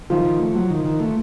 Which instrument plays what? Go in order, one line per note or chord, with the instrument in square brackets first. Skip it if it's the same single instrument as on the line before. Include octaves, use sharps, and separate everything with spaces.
[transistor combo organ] D#3 [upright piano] F3 F4
[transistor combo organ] D#3
A3
F#3
D#3
D#3
A3